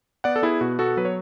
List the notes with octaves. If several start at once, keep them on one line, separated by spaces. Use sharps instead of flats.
B3 D5 F#5
A4
B3 E4 G#4
B2 F#4
B3 F#4 A4
F#3 B4
C#5